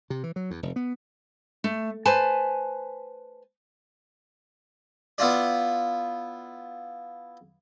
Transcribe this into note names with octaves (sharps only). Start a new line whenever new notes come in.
C3
E3
F#3
E2
F1
B3
A3
B4 C5 G#5 A5
B3 E4 F4 D5